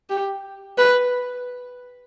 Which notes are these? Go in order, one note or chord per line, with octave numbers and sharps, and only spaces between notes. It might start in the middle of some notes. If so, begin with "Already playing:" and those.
G4
B4